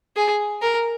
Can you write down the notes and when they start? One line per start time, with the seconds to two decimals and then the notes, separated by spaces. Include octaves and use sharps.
0.17 G#4
0.62 A#4